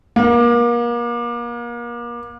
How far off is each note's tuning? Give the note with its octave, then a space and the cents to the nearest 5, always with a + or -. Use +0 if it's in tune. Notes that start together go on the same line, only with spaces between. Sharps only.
A#3 +35